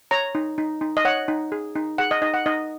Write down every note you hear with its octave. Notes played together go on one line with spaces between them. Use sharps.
C#5 A#5
D#4
D#4
D#4
D#5
C#5 F#5
D#4
G#4
D#4
G#4 F#5
D#5
D#4 D#5
F#5
D#4 D#5